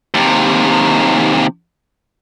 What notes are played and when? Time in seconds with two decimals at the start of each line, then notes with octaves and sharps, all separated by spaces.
0.14 D#2 C3